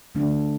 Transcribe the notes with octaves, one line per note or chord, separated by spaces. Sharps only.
D3 A3 D4